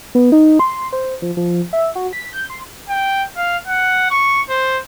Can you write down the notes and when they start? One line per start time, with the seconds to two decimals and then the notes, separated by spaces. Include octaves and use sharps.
0.15 B3
0.32 D#4
0.59 C6
0.93 C5
1.22 F3
1.37 F3
1.73 E5
1.95 F#4
2.13 B6
2.33 G6
2.50 C6
2.89 G5
3.37 F5
3.67 F#5
4.11 C#6
4.50 C5